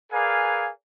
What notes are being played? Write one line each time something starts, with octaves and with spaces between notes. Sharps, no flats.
G#4 A#4 B4 D5 F5 G#5